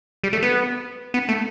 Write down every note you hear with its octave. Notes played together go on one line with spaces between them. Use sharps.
G3
A3
B3
B3
A3